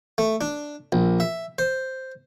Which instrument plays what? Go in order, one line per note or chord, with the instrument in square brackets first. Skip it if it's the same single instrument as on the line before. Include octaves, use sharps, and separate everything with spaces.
[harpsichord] A3
D4
A#1
E5
C5